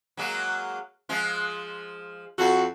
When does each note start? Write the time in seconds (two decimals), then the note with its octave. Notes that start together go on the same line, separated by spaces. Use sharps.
0.17 F#3 G#3 A#3
1.09 F3 G#3 F4
2.38 F2 F#4 A4